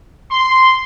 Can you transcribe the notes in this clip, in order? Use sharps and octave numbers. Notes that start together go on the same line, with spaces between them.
C6